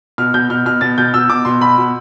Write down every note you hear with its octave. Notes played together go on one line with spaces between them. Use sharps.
B2 F6
B2 G6
B2 F6
B2 F6
B2 A6
B2 G6
B2 E6
B2 D6
B2 C6
B2 B5
B2